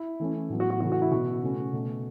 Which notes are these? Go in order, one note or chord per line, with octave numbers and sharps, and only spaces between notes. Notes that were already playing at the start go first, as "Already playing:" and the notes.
Already playing: E4
E3 A3 C#4
A2 F#3 B3
F#4
F#4
C#3 E3 A3 C#4 F#4
F#4
E4
B2 B3 F#4
C#3 A3 C#4
B2 A3 C#4